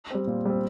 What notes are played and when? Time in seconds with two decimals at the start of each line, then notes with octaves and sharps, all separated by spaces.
0.11 G3 C4
0.27 A#2
0.45 G3 C4